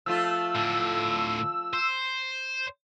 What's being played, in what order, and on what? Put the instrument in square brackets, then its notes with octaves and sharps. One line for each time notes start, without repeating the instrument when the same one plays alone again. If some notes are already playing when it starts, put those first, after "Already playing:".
[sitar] F3 A3 F4 [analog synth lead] E6
[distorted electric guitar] A2 D3
C5